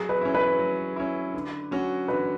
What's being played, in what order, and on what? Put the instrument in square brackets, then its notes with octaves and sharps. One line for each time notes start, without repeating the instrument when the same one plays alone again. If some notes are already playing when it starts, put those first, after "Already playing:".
Already playing: [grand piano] F#3 [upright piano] G#4
[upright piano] B4
[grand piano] C#4 E4
[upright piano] B4
[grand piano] F#3
C#4 E4
D3
F#3 C#4 F#4
[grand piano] D3 [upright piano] B4